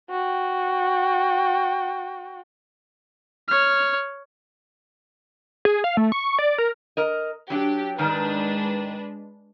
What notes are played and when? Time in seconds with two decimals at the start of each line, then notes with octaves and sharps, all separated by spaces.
0.10 F#4 G5
3.48 C#5 F6
5.65 G#4
5.84 F5
5.97 A3
6.12 C#6
6.39 D5
6.58 A#4
6.97 A#4 D#5
7.50 F#3 D4 G4
7.98 G#2 D#3 G#3 D4 B4